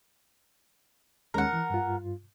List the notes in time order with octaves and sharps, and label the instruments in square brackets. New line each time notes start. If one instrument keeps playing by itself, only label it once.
[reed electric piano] D#2 G#3 C#4 [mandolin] A#4 F#5
[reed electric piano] E3
G2 F4